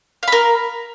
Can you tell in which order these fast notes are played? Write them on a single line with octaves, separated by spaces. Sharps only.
F5 B5 A#4